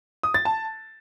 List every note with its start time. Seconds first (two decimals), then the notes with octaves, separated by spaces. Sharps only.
0.23 D#6
0.34 A6
0.45 A5